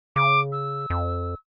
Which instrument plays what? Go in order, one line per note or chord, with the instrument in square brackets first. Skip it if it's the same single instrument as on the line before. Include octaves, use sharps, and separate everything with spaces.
[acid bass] C#3 [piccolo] D6
[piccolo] E6
[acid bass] F2